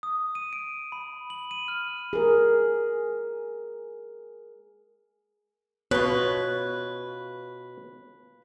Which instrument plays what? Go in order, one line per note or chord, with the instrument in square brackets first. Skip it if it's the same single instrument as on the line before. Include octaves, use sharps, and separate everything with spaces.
[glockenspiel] D#6
D#7
D7
B5
F#7
D#7
F6
[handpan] G#4 A#4
[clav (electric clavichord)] B2 [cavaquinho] F4 B4 [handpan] C#5